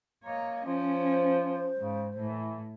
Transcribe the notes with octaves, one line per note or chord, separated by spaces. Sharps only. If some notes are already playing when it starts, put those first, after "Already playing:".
A#3 C#5 D#5 A#5
F3 C#4 C5
G#2 C#3
A2 E3